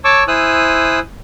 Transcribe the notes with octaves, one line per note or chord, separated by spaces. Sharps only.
C#5 A5 C#6 D6 E6
E4 C5 G#5 D#6 E6 F#6